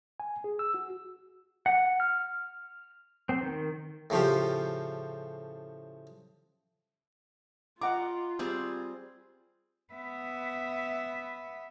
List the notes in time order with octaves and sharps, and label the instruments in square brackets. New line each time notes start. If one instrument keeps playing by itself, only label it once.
[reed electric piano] G#5
G#4
E6
F#4
[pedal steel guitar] F#5
F6
C4
D#3
[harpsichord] A2 C#3 F3 G4
[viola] F4 [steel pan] D#5 F#5 D6 [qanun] A#5
[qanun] G3 C4 G#4
[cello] B3 E5